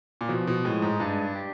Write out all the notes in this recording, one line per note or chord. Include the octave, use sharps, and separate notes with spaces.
A#2
B2 F3
B2
A2 G#3
G#2
G2 D4
G4